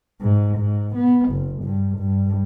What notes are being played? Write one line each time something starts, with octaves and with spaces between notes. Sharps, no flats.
G#2
G#2
B3
F#1
G2
G2